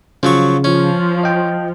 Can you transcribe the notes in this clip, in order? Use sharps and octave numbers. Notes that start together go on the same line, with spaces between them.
C#3 F3 F#3 C#6
F3 C#4
D#5 G5